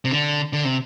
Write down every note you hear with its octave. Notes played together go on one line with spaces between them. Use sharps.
C3
D3
D3
C3